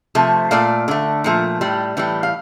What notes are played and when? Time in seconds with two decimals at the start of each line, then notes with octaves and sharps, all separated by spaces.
0.15 C3 F3 A3
0.51 A#2 A3 D5 F5
0.88 D3 A3
1.24 A#2 F3 A3
1.61 A2 G3
1.97 A2 E3 G3
2.23 F5